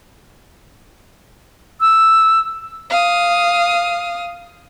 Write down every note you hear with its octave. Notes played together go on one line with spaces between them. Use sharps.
E6
F5 D#6